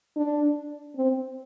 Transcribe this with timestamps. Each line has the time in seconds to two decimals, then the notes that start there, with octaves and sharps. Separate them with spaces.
0.17 D4
0.97 C4